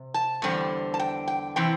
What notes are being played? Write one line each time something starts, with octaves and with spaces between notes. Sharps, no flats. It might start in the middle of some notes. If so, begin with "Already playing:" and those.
Already playing: C3
A5
E2 D3 G3 C4
A5
G5
G5
C3 E3 C4 E4 G5